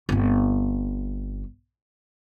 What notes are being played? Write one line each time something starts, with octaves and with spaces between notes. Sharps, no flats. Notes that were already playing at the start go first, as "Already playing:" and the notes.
G1 C4